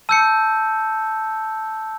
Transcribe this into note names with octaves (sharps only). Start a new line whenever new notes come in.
A5 E6 G6 C#7